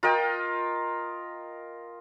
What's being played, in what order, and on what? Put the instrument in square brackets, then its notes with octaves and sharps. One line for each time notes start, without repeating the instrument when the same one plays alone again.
[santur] F4 A#4 D#5 G5